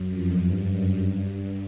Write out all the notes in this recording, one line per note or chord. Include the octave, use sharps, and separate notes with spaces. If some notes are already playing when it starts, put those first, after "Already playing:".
Already playing: F#2
F2
G2
F#2
G2